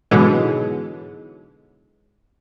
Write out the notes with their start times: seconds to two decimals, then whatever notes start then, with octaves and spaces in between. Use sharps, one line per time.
0.11 G#2 B2 D3 E3 F#3 G#3